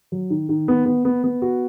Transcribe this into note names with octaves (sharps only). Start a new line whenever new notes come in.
F#3
D#3
D#3
B3
B3
B3
B3
F#4